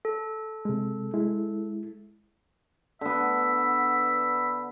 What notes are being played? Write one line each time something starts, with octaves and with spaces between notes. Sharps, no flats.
A4
C3 G#3
G#3 E4
D3 B3 E5